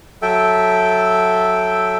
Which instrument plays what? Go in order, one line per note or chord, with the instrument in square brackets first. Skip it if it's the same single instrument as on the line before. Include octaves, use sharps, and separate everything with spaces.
[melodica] F#3 A4 E5 G5